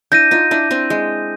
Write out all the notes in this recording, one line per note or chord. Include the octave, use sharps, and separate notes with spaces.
D4 E4 G6 A#6 D#7
D#4 F4
D4 E4
C4 D4
G#3